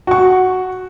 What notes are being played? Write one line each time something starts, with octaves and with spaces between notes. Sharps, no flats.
F#4 C#6